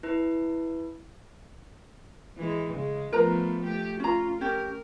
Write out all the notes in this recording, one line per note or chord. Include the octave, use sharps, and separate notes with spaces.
E4 B4
E3 G#3
C#3 G#3
F3 A3 B3 A#4 B4 A#5
A3 G4
C#4 F4 A#5
C#4 G4 A#4